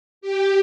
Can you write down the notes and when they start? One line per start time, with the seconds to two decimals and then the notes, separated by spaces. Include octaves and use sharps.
0.21 G4